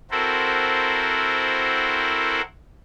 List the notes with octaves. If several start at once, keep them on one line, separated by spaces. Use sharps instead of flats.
C4 E4 F#4 A4 A#4 C5